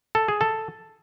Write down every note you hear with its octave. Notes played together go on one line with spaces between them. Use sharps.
A4
G#4
A4